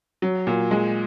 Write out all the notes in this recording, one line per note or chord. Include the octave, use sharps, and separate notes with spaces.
F#3
A#2
G#3